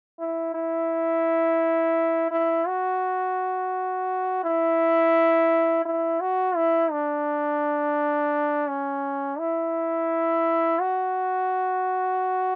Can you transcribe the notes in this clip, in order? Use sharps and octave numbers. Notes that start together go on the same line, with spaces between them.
E4
E4
E4
F#4
E4
E4
F#4
E4
D4
C#4
E4
F#4